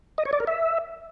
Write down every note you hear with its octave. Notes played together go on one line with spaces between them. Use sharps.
D#5
C#5
D5
A#4
E5